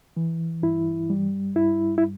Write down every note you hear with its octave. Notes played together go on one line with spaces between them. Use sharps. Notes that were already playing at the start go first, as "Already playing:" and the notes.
E3
G2 E4
G3
G2 E4
E4